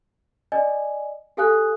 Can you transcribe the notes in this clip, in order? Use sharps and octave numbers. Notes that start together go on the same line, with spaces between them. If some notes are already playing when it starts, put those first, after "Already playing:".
D5 D#5 G#5
G4 A4 F5 G#5 D#6 F#6